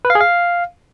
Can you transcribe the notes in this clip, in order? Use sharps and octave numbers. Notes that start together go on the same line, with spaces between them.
B4
F5
G#4
F5